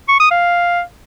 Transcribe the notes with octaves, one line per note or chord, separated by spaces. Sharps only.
C#6
D#6
F5